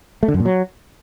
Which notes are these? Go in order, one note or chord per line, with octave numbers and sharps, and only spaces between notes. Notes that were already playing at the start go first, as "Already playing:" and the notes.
A3
D3
F#2
A#2
F#3